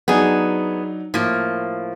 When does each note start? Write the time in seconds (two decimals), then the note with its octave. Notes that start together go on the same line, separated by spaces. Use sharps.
0.08 F#3 B3 D4 D#4 G#4
1.14 A2 F3 A#3